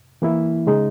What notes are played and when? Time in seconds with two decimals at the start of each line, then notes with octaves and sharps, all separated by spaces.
0.22 E3 A#3 E4
0.67 C#3 G#3 D#4